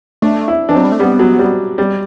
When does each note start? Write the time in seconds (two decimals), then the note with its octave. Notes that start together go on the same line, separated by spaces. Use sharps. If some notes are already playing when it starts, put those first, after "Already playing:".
0.22 A3 D4
0.48 E4
0.69 E3 D4
0.75 F#3 C4
0.85 G3
0.92 A3
1.00 G3 B3
1.19 F#3
1.39 G3
1.78 G3